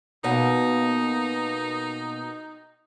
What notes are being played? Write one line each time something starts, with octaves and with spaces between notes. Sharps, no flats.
B2 A#3 D#4